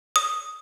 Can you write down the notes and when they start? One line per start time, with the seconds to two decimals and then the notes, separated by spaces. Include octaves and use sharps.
0.16 D#6